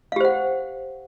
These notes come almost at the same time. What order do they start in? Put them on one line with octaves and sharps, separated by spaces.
F5 G4 C5 F#5